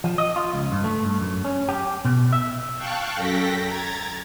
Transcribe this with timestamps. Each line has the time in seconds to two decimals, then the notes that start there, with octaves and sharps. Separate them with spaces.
0.04 F3
0.18 D#5
0.36 F4
0.53 C#2
0.72 G2
0.84 A3
1.05 G2
1.21 F#2
1.45 C#4
1.69 G4
2.05 B2
2.33 E5
2.78 F5 G5 A5 C#6 F#6
3.16 F#2 A4 G5 A#6 B6
3.65 A#5 G#6 A6